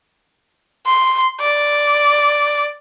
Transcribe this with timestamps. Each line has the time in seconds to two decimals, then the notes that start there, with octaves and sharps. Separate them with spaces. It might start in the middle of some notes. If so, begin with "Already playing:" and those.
0.87 C6
1.41 D5